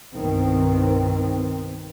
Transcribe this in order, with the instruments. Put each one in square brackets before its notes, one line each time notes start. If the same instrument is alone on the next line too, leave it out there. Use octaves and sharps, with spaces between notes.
[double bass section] C2 G2 B2 D#3 C4